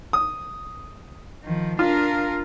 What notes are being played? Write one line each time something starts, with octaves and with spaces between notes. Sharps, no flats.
D#6
D#3 F3
D4 F4 A#4